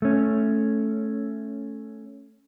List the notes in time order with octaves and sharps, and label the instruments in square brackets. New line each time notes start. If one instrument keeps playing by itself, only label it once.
[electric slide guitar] A3 C#4